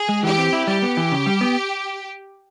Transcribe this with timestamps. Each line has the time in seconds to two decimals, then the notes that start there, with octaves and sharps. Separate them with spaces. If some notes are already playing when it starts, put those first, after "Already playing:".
Already playing: G#4
0.09 G#3
0.23 E3 G4
0.38 C4
0.53 E4
0.67 G3 G4
0.82 B3
0.97 E3
1.12 C#3
1.26 G3
1.41 B3